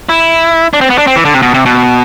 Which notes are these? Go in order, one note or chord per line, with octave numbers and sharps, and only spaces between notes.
E4
D4
C4
B3
D4
C4
E3
D3
C3
B2
C3
B2